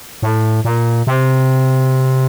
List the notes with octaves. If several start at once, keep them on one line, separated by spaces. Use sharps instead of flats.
A2
A#2
C3